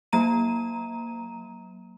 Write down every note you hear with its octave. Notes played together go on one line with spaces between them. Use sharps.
F#3 A#3 A#5 D#7